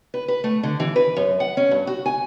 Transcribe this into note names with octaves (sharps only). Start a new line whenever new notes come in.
B4
B4
A3
D3
E3
B4
F#2
F#5
C#4
G2
F#4
G#5